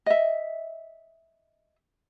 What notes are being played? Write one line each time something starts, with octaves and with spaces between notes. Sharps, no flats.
D#5 E5